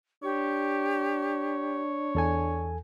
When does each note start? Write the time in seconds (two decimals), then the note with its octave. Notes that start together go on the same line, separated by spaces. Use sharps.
0.23 D4 G4 C#5
2.15 E2 A4 G#5